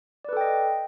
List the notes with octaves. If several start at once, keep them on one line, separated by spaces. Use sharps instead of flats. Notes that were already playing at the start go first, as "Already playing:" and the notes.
A4 B4 D5 D#5 G5